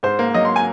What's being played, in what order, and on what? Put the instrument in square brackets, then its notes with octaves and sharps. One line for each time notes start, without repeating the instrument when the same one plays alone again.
[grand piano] G#2 [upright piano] C5
[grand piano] A#3
[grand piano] F#3 [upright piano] D#5
[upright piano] C6
G#5